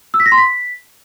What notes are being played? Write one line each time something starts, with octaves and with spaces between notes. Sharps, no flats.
E6
B6
A#6
C6
B6